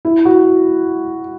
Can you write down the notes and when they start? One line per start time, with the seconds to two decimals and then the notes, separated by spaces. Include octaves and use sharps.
0.05 E4
0.25 F#4